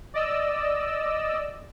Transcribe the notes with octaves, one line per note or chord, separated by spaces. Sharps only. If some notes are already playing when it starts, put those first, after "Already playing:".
D5 D#5 E6